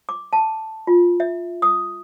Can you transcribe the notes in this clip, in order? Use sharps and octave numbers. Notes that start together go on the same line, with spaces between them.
D6
A5
F4
E5
D#6